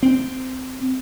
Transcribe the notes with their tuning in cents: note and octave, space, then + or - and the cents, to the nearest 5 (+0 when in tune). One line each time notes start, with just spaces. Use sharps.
C4 -15